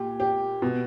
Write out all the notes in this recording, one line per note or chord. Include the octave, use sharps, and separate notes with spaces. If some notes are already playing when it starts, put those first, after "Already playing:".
Already playing: A#2 G4
G4
B2